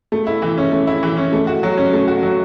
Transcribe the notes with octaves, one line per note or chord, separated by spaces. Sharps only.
A3
E4
E3
C#4
A3
E4
E3
C#4
A3
F#4
F#3
C#4
A3
F#4
F#3